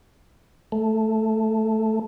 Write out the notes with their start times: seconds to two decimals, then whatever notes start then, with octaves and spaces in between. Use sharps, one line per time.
0.72 A3